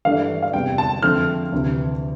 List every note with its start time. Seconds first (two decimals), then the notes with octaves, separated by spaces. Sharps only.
0.05 G2 E3 A3 D4 F5
0.43 F5
0.53 E2 C3 G3 G5
0.78 A5
1.03 F2 D3 F3 A3 C4 F6
1.52 D2 C3 E3